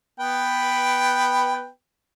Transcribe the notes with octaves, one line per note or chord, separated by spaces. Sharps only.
B3 B4 G5